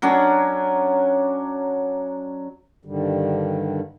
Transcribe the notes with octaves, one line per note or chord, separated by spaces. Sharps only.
F#3 C#4 D4
G2 D3 D#3 G3